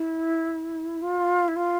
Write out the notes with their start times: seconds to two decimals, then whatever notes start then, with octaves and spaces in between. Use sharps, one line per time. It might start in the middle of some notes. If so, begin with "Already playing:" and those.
Already playing: E4
1.02 F4
1.48 E4
1.56 F4